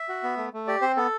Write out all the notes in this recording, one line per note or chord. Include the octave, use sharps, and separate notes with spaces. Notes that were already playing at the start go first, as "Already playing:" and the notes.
Already playing: E5
F#4
B3
A3
A3
G4 D5
C4 C5
B3 A4